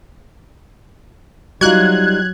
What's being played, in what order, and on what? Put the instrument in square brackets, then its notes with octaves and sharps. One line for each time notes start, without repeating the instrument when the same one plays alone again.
[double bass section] F#3 [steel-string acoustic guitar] G3 D#4 F4 [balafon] F#4 [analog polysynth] F#6 G#6